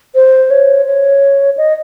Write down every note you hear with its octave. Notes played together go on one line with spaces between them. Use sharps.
C5
C#5
C#5
D#5